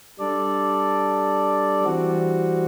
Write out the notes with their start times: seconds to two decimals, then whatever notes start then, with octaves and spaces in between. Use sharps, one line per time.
0.19 G3 D4 A4 D5
1.84 E3 G3 C4 F#4